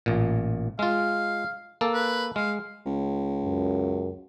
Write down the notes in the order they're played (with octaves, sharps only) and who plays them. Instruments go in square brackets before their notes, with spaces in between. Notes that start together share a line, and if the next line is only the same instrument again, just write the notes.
[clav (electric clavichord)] A1 A#2
[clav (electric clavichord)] G#3 F4 [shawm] F5
[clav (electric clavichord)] A#3 A4
[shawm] B4
[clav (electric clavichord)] G#3 [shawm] F5
[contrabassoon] C#2
[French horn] F#2